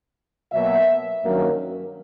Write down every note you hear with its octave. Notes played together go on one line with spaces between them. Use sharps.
B2 F#3 A#3 E5
G2 D#3 F#3 A#3 C#4